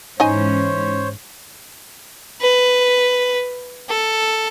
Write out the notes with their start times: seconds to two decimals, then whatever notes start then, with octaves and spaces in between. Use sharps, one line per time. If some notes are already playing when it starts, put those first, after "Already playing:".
0.20 G#2 E3 C#4 D#4 C5 C#5 D#5 G#5
2.41 B4
3.88 A4